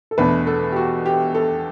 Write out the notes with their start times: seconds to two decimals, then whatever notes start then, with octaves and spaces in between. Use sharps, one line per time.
0.11 A4
0.18 E2 B2 A3 D4 B4
0.47 A4
0.72 G4
0.76 F#4
1.06 G4
1.35 A4